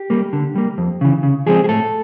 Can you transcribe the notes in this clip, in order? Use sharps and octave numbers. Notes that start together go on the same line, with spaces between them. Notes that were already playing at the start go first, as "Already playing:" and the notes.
Already playing: G4
G3 A#3
D3
G3 A#3
F2
C#3 E3
C#3
F3 G#3 C4 G#4
G#4
A2 A4